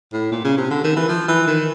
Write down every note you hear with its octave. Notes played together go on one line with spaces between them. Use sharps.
A2
A#2
C#3
C3
D3
D#3
E3
F3
E3
D#3